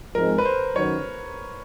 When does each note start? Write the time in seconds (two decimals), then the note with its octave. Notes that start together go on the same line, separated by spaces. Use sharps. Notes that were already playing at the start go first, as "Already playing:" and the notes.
0.14 G#2 F3 G#3 C4 A#4
0.38 B4
0.45 C5
0.75 F#2 D#3 F#3 C#5